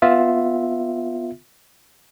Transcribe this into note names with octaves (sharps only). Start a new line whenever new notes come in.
B3 F4 E5